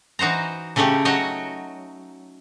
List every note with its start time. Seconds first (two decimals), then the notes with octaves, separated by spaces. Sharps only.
0.19 E3 D#4 F#4 C5 A#5
0.76 C#3 A3 C#4 D#4 G4
1.05 F#3 D#4 F#4 C#5 D#5